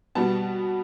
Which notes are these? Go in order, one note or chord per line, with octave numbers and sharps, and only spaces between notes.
B2 G3 B3 A5